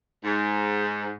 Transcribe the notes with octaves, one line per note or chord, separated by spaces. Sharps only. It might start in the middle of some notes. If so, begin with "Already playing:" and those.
G#2